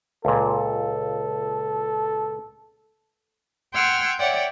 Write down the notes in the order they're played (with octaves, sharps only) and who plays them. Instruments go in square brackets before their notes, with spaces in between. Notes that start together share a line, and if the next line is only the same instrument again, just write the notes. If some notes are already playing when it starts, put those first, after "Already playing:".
[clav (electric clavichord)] C#2 A#2 [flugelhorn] A4
[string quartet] F#5 G5 C6 E6 F6 G#6
C#5 D5 E5 F#5 G5